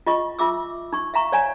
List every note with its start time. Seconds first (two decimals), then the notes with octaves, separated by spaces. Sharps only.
0.07 F4 D#5 C#6
0.39 F4 E5 D6 E6
0.93 D#4 C#6
1.14 E5 F5 A#5 C#6
1.32 C#5 D5 F5 G#5 A#5